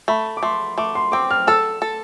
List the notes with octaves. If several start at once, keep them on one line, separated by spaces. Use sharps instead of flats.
A3 B5
D6
A3 C6
A3 D6
C6
C4 D6
F6
A4 E6
A4